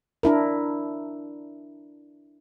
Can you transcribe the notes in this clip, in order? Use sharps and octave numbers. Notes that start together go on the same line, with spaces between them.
D4 E4 A#4